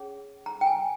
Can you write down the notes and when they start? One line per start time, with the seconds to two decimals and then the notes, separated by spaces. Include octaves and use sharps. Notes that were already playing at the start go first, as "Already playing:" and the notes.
Already playing: C#4 G#4 C#5
0.46 A#5
0.61 G5
0.67 G#5